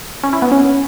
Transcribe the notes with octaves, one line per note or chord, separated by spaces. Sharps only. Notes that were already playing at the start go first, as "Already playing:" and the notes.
C#4
E4
B3
C#4